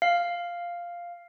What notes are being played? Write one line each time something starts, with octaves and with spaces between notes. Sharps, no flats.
F5